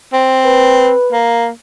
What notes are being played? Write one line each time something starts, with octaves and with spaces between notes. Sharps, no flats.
C4
B4
A#3